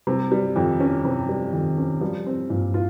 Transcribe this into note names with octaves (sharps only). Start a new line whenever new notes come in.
C3 G3
G3
F2 D#3
C#4
C3 F3
G3
F2 D#3
C#4
F3 G3
C4
G2 A#2
F4